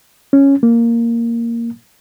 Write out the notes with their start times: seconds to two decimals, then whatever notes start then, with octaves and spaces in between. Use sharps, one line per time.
0.33 C#4
0.63 A#3